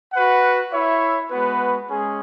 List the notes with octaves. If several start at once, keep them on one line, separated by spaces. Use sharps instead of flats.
F#4 B4 F#5
E4 C#5 E5
G#3 B3 F#4 B4
G#3 C#4 G#4